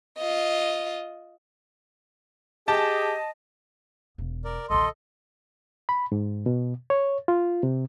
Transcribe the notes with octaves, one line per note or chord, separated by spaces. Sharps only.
F4 D#5
G4 G#4 D#5 A5
E1
A#4 D5
A#1 D#2 A4 D#5 C6
B5
G#2
B2
C#5
F4
C3